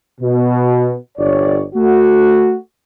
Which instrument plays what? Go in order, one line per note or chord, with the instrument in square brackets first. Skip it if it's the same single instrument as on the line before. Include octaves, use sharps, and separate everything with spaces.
[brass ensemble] B2
G1 C#5 D5
A3 F#4